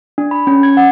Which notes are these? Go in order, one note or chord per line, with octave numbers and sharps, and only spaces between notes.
D4
B5
C#4
G#6
F#5